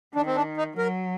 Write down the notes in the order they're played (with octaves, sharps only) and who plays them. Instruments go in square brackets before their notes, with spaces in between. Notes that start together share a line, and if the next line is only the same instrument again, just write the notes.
[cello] D#3 [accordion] D4
[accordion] C4
D4
D#4
[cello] F#3 [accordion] A#4